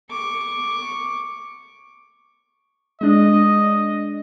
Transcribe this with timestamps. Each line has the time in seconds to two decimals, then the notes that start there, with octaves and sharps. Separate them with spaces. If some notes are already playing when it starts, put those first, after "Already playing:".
0.11 C#6 D6
3.01 G#3 D4 D#5